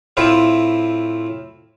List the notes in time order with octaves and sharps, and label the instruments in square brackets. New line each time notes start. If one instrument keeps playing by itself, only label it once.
[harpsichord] A2 C4 E4 F4